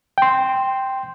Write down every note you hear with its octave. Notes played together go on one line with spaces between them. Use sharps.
G5 C6